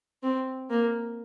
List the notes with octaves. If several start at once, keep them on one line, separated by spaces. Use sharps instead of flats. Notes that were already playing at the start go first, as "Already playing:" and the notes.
C4
A#3